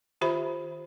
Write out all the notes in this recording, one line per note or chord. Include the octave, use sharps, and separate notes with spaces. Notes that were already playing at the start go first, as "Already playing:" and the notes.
D#3 F4 G4 C5 E5 B5